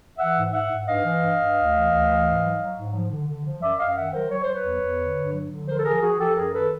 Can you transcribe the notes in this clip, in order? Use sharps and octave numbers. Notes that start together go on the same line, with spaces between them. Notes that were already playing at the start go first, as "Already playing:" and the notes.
E3 E5 F#5
G#2
G#2 E5 F#5
G#2
G2 D#5 F5
E3
G2
G2
D2
E3
D2
E3
G#2
F#3
F#3
G#2
F3
D3
D3
F3
F#2 D5 E5
F#2 D#5 F5
D#3 E5 F#5
F#3 A#4 C5
F#3 C#5
C5
F#3
B4 C#5
E2
E2
D3
G2
F#3
D3
F3 A#4 C5
A4
F3 G#4 A#4
F3 F#4 G#4
F3 G4 A4
F#2 G#4 A#4
D#3 A4 B4